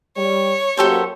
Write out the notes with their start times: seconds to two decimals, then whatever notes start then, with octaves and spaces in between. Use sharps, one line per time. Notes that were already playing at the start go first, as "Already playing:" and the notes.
0.17 G3 C#5
0.77 F#2 A#3 F#4 G4 A4 C5